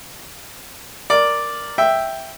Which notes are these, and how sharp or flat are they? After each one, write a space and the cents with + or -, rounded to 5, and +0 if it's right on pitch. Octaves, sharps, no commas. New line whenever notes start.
A#4 +0 D5 +0
E5 +0 G5 +0